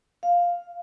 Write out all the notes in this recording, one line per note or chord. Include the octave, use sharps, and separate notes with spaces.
F5